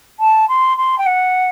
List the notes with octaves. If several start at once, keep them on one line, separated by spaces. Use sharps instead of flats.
A5
C6
C6
G5
F#5